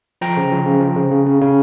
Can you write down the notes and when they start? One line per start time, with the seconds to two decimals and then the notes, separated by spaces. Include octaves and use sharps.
0.21 F3 G5 A#5
0.37 C#3
0.52 F3
0.65 C#3
0.80 F3
0.96 C#3
1.11 C#3
1.26 C#3
1.41 C#3